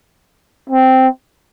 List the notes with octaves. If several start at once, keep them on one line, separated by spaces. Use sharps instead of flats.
C4